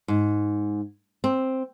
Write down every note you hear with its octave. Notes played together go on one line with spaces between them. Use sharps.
G#2
C4